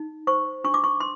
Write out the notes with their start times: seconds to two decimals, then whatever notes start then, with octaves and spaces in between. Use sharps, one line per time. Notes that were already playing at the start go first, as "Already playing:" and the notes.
Already playing: D#4
0.27 C5 C#6
0.64 D4 C#6
0.74 D6
0.84 C#6
1.00 C6